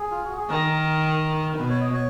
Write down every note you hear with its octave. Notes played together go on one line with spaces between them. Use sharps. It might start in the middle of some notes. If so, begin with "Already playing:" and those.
Already playing: G#4
F4
F#4
G#4
D#3 A#4
A#4
B2 B4
C#5
D#5
C#5